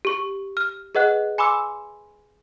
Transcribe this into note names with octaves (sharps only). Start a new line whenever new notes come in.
G4 C#6
F6
G#4 B4 D#5 F#5 F#6
G#5 B5 C6 D6 E6